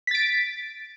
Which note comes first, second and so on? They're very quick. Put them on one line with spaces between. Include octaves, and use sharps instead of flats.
B6 A6 D7